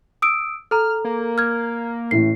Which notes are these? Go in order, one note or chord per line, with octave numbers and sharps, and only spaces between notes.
D#6 E6 D7
A4 A#5 F6
A#3
F6 G#6
A1 A2 C7